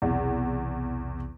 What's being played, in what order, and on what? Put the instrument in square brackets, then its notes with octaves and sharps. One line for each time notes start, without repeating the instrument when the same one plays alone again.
[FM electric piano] B1 C3 [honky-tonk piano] E2